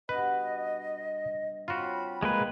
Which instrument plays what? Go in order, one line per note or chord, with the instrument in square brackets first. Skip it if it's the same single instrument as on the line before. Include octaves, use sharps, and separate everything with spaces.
[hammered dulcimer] G2 B2 F#4 [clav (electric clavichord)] B4 [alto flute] D#5
[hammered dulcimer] C4 C#5 [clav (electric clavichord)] F4 F#4 [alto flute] B5
[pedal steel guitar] G#3 A#3 B4